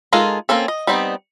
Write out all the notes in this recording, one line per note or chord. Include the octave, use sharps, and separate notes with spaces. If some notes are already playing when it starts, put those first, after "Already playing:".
G#3 D#4 F4 A4 A#4
A#3 C4 C#4 A4
D#5
G3 B3 C4 D#4